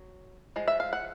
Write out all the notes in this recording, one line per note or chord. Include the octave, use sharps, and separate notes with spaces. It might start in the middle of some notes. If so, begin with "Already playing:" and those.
Already playing: F#3
F3 G#3
E5
F5
F#5